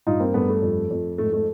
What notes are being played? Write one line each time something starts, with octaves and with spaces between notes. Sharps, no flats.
G2 D#4 F4
A#3 C4
G2 A3 B3
A3
F2
F2
G#2 A3
A3